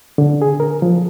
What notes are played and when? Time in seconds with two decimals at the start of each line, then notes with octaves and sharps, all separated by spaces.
0.18 D3
0.42 G#4
0.60 A#4
0.82 F3